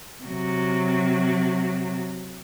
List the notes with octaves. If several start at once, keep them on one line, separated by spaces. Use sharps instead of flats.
C3 F#3